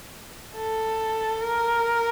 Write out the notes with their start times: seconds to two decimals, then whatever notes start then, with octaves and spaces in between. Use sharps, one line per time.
0.56 A4
1.41 A#4